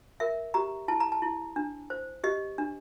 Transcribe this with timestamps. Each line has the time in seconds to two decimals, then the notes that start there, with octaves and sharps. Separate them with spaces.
0.20 A#4 E5
0.54 G4 A#5
0.88 E4 A5
1.00 A#5
1.12 A5
1.22 E4
1.56 D4
1.90 C5
2.24 G4 D#5
2.58 D4